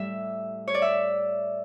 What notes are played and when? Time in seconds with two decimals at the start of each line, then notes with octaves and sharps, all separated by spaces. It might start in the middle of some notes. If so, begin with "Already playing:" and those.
Already playing: A2 G3 E5
0.68 C#5
0.74 D5
0.82 E5